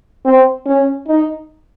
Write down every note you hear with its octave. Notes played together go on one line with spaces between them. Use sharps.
C4
C#4
D#4